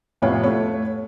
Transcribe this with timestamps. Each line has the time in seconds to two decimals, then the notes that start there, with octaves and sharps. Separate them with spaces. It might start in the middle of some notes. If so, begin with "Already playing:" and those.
0.22 F2 A2 C3 B3 C#5 F5
0.43 A3 C#5